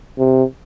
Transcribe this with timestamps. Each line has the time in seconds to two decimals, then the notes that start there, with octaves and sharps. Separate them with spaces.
0.18 C3